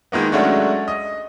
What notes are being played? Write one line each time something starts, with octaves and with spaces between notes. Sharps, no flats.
D#3 G#3 A#3 B3
F#3 G#3 A3 C#4 D4 F#4
D#5